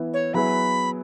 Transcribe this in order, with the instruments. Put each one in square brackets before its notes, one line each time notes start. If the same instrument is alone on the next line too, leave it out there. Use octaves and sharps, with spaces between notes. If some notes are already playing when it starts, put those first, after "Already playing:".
Already playing: [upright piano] E3 B3 E4 B4
[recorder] C#5
[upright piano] F#3 B3 E4 G#4 B4 [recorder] B5